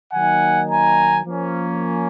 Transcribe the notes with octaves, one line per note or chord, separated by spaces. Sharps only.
D#3 F#3 A#3 D#4 F#5 G#5
G#5 A#5
F3 A#3 C#4